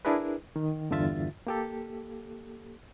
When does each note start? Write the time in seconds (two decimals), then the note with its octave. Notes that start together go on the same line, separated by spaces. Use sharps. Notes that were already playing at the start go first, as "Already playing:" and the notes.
0.05 D4 E4 G#4 A#4 B4
0.56 D#3
0.91 E2 G2 D3 F4 E5 A6
1.47 A#3 G4 A4